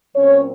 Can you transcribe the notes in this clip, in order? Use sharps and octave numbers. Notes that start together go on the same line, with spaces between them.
A#2 F#3 C4 C#4 C#5